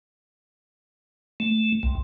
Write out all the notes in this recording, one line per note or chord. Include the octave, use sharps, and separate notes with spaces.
A3
C2